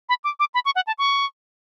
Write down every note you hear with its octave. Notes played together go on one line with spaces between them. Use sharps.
B5
D6
D6
B5
C#6
F#5
A5
C#6